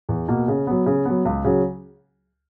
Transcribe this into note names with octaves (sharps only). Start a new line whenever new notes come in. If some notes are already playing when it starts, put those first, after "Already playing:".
E2
B2 A#3
C#3
F#3 B3
C#3
F#3 B3
C#2
C#3 F#3